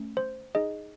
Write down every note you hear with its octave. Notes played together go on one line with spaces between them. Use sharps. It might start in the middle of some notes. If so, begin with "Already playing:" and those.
Already playing: A3 C#4
C5
D#4 G#4 D#5